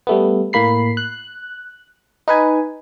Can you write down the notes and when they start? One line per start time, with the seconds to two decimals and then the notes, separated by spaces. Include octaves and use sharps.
0.07 G3 A3 B3
0.53 A2 A#3 B5 C7
0.97 F#6
2.28 D#4 B4 G#5